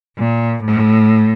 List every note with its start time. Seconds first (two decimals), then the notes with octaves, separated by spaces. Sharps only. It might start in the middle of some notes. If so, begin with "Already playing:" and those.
0.18 A#2
0.63 A2